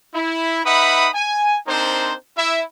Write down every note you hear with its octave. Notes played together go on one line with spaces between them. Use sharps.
E4
D#4 B4 E5 F#5 B5 D#6
G#5
C4 D4 D#4 A#4 C5
E4 E5